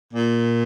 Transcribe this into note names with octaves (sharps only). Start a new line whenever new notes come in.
A#2